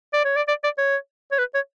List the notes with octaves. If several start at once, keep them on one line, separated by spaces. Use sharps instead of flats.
D5
C#5
D5
D5
D5
C#5
C#5
B4
C#5